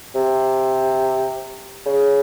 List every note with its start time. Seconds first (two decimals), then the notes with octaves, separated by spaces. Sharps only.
0.15 C3
1.86 C#3